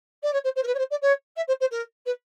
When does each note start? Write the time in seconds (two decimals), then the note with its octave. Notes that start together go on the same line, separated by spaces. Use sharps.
0.22 D5
0.33 C#5
0.44 C5
0.55 C5
0.63 A#4
0.67 B4
0.74 C#5
0.78 C5
0.90 D5
1.02 C#5
1.36 E5
1.47 C5
1.60 C5
1.71 A#4
2.05 B4